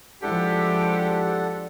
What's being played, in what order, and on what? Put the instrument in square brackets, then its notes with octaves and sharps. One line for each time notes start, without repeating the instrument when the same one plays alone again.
[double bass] F3 G#3 [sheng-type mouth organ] D4 A4 F#5 [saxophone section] E4 G4